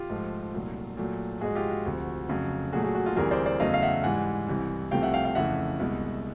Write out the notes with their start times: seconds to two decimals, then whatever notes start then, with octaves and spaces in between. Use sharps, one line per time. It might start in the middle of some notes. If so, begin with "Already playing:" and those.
Already playing: F4 G4
0.10 G#2 F3 A3
0.54 C2 A#2 F#3 A3
0.97 A#2 F#3 A3
1.41 G#2 F3 G#3 F#4 G#4
1.55 F4 G4
1.70 F#4
1.86 D2 C3 F3
2.29 F2 C#3 F#3 A3
2.73 A#2 F#3 A3 F#4 G#4
2.83 F#4 G#4
2.95 F#4
3.06 F4
3.16 D2 C3 E3 G3 G#4 A#4
3.31 C5 D5
3.46 C5 D5
3.60 E2 C#3 F#3 A3 D#5 F5
3.74 F5
3.82 E5 F#5
4.04 G#2 E3 G3 F#5 G#5
4.48 C2 C3 E3
4.91 C2 C3 F3 A3 F5 G5
5.02 E5 F#5
5.14 F5 G5
5.25 F5 G5
5.35 F2 C#3 E3 A3 E5 F#5
5.80 C2 B2 G#3